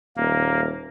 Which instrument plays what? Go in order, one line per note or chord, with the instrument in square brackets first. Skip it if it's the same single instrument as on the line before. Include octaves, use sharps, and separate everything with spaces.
[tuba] D#1 [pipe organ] A#3